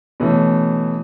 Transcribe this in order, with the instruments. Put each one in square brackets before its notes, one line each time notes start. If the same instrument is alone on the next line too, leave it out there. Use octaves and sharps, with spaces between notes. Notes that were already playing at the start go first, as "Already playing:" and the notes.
[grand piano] B2 E3 A3 C#4